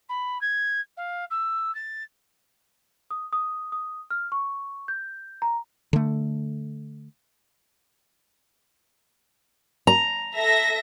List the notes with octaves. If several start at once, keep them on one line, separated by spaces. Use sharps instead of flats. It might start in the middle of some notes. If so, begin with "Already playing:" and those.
B5
G#6
F5
E6
A6
D#6
D#6
D#6
F6
C#6
G6
A#5
D3 A3
A#5
A4 E5 A#6